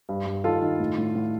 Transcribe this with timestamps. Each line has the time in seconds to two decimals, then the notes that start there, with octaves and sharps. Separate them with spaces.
0.09 G2
0.26 G2
0.44 D#3 F4 A4
0.62 D#3
0.80 A2
0.98 A2
1.15 A2